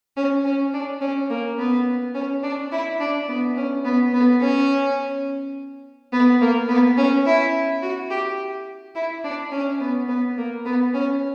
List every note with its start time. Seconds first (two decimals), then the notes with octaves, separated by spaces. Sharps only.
0.17 C#4
0.45 C#4
0.73 D4
1.01 C#4
1.30 A#3
1.58 B3
2.15 C#4
2.43 D4
2.72 E4
3.00 D4
3.28 B3
3.57 C#4
3.85 B3
4.13 B3
4.41 C#4
6.12 B3
6.41 A#3
6.68 B3
6.97 C#4
7.26 E4
7.82 F#4
8.10 G4
8.95 E4
9.24 D4
9.51 C#4
9.80 B3
10.08 B3
10.37 A#3
10.65 B3
10.94 C#4